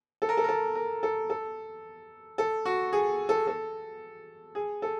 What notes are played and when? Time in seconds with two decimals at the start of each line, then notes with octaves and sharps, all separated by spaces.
0.22 A4
0.29 A#4
0.37 A4
0.44 A#4
0.49 A4
0.75 A#4
1.03 A4
1.30 A4
2.38 A4
2.65 F#4
2.93 G#4
3.29 A4
3.47 A4
4.55 G#4
4.82 A4